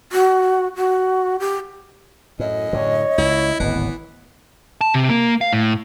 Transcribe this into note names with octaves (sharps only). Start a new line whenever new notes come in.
F#4
F#4
G4
F#2 A2 D#5
A2 D3 C#5
C#2 E4
D1 G#1 E3 B3
A5
C3
A#3
F5
A2